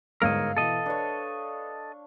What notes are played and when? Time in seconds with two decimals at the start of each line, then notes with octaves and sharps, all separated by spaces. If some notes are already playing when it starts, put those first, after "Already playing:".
0.22 G1 G#2 A#4 C#5 D#5 F5 E6
0.57 B2 E3 A4 D#5
0.86 D4 B4 C#5